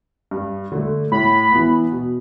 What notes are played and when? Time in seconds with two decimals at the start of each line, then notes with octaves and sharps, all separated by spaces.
0.31 G2
0.72 D3 A3
1.12 A2 B5
1.51 E3 B3
1.92 B2